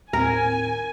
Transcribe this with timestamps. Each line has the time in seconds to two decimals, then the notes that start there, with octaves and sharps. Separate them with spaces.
0.13 D#2 A2 C4 A#4 G#5